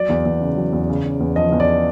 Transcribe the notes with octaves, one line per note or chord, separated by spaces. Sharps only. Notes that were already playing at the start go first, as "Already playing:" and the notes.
Already playing: F#3 D5
E2
E2
C#3
F#3
E2
C#3
C#3
E2
F3 D#5
E2
D5